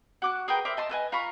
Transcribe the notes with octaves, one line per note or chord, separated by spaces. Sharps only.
F#4 D6 F#6
G#4 A#4 B4 G5
A#4 C5 D5 E5
D#5 A5 C6
A4 B4 D#5 G#5
F4 A#5 B5 C#6